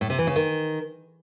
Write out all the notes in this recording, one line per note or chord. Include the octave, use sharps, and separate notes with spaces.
A2
C3
E3
C#3
D#3